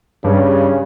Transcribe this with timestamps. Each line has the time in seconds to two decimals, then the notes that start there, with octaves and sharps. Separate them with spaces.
0.24 G2 C#3